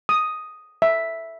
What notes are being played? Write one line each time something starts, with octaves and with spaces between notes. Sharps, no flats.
D#6
E5